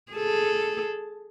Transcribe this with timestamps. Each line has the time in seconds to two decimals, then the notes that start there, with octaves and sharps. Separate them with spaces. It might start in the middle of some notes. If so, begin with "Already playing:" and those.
0.12 G#4 A4